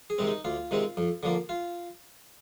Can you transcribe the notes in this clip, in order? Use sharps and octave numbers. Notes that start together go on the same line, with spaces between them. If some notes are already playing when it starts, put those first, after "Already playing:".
G#4
C3 D#3 G#3 C4
D#4
D2 F4
C3 D#3 G#3 C4
F2
D3 F3 A#3
F4